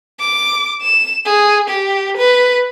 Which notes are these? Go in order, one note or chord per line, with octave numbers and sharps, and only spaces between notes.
D6
E7
G#4
G4
B4